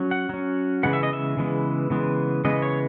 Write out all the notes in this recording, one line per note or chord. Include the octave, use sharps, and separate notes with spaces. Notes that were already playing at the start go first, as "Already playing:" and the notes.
Already playing: F#3 C#4
F#5
F#3 C#4
C#3 E3 G#3 B3 F#5
E5
D#5
E5
C#3 E3 G#3 B3
C#3 E3 G#3 B3
C#3 E3 G#3 B3 D#5
C#5